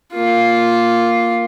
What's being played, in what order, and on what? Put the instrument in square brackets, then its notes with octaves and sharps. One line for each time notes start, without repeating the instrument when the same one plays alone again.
[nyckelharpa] A#3 F4